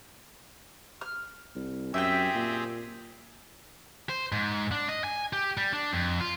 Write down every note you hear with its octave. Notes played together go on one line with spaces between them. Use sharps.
F6
C2
F#2 C4 G4 G#4 E5 G5
A#2
C5
G#2
D4
D#5
G#5
G4
G3
D4
F2
F4